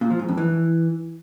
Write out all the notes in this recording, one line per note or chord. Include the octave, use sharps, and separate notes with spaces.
A#2
F3
G#2
F2
E3